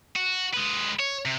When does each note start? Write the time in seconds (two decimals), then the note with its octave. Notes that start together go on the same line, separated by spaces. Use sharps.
0.16 F#4
0.54 G#3 B4
0.99 C#5
1.25 C3